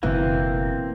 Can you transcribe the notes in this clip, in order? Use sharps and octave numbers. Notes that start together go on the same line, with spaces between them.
F#1 B2 E3 A#3 C4